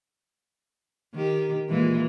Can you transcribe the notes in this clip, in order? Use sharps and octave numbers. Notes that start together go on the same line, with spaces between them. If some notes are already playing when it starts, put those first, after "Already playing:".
D#3 G4
A#2 E3 G#3